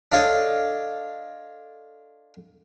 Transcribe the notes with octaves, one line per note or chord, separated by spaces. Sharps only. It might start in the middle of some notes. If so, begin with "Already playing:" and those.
D4 F4 A4 C#5 D#5